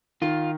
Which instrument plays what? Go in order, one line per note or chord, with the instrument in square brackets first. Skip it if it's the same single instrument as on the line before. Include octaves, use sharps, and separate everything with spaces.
[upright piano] D#3 [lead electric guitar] F4